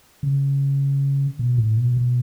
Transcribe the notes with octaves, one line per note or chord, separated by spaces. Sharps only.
C#3
B2
A2
B2
B2